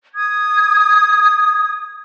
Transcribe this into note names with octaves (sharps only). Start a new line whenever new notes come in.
D#6 G#6